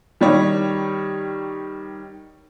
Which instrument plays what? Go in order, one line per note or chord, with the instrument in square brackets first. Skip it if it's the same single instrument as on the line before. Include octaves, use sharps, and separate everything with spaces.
[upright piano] D#3 G3 D#4 C#5